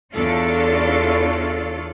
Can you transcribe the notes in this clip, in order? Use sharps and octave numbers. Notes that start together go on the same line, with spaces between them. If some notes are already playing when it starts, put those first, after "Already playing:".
E2 D4 F4 A4 C#5